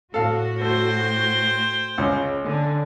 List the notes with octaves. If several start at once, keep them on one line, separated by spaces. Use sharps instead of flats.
A2 F#4 A4 F5
A3 C5 G5
C#2 C#3 C#4
D3